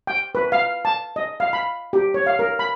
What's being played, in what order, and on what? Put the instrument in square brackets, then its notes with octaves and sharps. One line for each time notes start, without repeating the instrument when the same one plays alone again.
[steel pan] G5
B4
F5
A5
D#5
F5
B5
G4
C#5
F5
A#4
B5